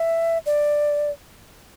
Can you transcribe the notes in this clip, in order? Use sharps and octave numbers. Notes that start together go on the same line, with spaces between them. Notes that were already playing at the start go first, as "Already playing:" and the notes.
Already playing: E5
D5